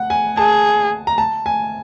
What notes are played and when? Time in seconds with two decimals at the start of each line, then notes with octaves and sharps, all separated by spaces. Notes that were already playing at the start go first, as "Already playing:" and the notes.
Already playing: F#5
0.10 G#5
0.37 G#4 A5
1.07 A#5
1.18 A5
1.46 G#5